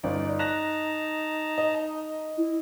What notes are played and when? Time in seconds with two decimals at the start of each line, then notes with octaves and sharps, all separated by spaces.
0.04 G1 D#4 D5
0.39 A5 A#5 F#6 A#6
1.58 D#5
2.38 E4